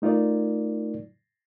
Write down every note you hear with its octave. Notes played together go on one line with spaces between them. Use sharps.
A3 D#4 F4 A#4 D5